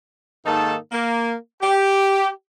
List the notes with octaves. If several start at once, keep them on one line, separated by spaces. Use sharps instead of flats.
G#2 D#3 A#3 D#4 A4 A5
A#3
G4